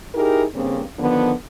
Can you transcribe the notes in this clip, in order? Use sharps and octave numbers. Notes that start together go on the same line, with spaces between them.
D#4 E4 G4 G#4 A#4
G2 C#3 A#3 C4
D3 D#3 F3 B3